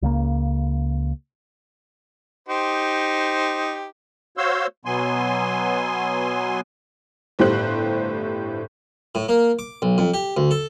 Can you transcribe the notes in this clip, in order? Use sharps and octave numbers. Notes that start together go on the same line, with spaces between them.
C#2 C#3 A3 A#3
D#4 G4 C5
F#4 C5 C#5 F5 C6 E6
B2 F#3 B3 G#5 C6
G1 A2 G4 C5 F#6
A2
A#3
D6
B1
F2
G4
D2
A4